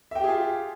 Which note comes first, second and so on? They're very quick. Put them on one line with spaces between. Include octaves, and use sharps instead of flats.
E5 G5 G4 G#4 F4